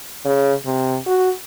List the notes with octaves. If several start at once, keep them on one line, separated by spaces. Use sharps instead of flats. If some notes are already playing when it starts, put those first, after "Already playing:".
C#3
C3
F#4